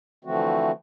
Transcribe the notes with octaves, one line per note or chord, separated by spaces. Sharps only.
D3 E3 F3 A3 C4 F#4